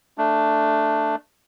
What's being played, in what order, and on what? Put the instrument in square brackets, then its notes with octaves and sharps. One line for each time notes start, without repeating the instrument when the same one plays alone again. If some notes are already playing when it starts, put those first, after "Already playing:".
[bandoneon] A3 D4